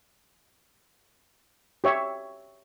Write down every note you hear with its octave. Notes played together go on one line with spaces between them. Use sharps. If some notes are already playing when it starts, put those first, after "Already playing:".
G4 C#5 E5